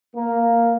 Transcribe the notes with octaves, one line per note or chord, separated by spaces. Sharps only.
A#3